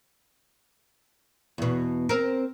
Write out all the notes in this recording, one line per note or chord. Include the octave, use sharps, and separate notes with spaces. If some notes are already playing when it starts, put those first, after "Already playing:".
E2 B2
C4 A#4